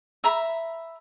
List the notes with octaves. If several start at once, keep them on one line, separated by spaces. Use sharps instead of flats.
E5 A#5 B5